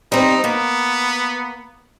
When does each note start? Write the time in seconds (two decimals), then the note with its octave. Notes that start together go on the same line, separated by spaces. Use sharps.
0.12 G3 C4 D#4
0.44 A#3 B3